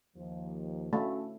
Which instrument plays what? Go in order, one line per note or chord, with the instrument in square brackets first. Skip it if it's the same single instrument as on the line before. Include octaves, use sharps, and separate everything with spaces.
[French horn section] D#2 F3
[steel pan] A3 [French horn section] C#4 F#4